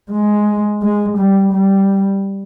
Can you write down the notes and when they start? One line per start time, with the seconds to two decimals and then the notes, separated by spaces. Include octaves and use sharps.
0.11 G#3
0.82 G#3
1.17 G3
1.53 G3